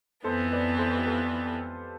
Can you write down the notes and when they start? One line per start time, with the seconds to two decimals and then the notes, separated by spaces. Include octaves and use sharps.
0.24 F2 E3 B3 A4 C5
0.52 B4 D5
0.79 A4 C5
0.97 G4
1.06 F4 A4